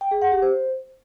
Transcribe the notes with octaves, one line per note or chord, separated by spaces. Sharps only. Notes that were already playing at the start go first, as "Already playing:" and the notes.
G5
G#4
F#5
G4
C5